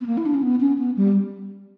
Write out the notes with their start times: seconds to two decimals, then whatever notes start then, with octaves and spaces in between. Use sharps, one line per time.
0.01 B3
0.06 A#3
0.17 E4
0.26 D4
0.34 C#4
0.43 B3
0.60 C#4
0.78 B3
0.97 G3